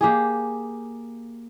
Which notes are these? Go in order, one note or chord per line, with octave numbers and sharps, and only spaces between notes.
A#3 G4 G#4